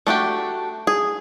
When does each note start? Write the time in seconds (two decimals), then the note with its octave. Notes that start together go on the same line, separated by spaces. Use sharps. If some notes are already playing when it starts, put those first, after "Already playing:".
0.07 A3 D4 F#4 G4
0.87 G#4